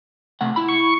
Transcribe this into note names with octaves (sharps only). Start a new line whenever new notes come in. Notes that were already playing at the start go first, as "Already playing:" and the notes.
C3 A3 F#5
E4 B5
C#6